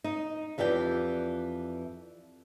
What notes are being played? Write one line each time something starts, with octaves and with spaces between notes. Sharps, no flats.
D#4
F2 E3 G4 D5 G5